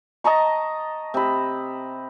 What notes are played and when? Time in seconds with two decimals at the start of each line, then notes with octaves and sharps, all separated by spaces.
0.24 D#5 A5 A#5 C#6
1.14 C3 B5